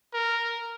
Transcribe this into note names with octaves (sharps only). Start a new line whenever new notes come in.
A#4